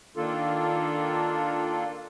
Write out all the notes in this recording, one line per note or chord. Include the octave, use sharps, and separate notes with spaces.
D#3 A#3 D4 F4 A4